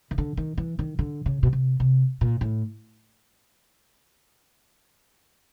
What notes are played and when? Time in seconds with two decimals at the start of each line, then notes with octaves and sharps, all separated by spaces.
0.11 D#3
0.18 D3
0.37 D#3
0.58 E3
0.79 D#3
0.99 D3
1.26 C#3
1.43 B2
1.53 C3
1.80 C3
2.21 A#2
2.41 A2